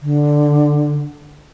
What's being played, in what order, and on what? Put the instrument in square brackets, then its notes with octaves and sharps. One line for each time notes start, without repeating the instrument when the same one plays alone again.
[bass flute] D3